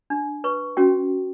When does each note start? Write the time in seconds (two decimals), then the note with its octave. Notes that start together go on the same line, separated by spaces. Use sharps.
0.10 D4
0.44 B4 C#6
0.77 C#4 F#4 G5